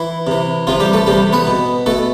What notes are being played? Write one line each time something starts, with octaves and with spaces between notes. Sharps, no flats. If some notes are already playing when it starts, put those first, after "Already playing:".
Already playing: E3 E4
C3 E3
C3 E3 F3 F4
G3 G4
A3 A4
C3 E3 G3 G4
B3 B4
B2
B2 A3 A4